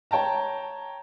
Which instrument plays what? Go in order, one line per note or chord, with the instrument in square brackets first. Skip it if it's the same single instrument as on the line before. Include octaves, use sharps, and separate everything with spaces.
[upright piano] C#5 G5 A5 A#5